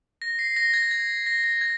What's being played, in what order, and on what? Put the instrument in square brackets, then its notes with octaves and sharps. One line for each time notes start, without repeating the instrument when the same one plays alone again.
[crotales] A#6
C7
A#6
G#6
G#6
A#6
A#6
G#6